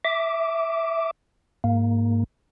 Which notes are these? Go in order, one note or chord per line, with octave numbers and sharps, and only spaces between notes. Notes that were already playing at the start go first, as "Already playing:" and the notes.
E5 D6
G#2 A#3